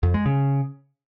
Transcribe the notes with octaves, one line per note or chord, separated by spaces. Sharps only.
F2
G#3
C#3